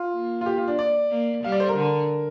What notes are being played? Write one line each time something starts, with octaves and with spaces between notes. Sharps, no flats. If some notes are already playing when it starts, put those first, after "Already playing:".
Already playing: F4
A#3
F4
G4
F4
D4
D5
A#3
G3 F5
D5
C5
A#4
D3